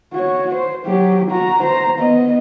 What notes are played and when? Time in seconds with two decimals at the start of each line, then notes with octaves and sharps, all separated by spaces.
0.13 F#4 C#5
0.54 C5
0.86 F#3 G4
1.30 F#4 A#5
1.62 C5 A#5
1.98 B3 D#5